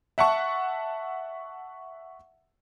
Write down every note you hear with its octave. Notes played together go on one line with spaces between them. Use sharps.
E5 F#5 A5 C#6